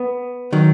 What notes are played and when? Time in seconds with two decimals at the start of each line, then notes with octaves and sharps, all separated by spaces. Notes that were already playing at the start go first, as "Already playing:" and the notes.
Already playing: B3
0.53 D#3 F#3